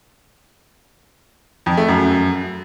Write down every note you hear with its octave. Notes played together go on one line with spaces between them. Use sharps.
F2
A3
F#2